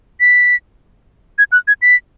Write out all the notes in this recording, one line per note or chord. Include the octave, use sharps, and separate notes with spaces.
B6
G#6
F#6
G#6
B6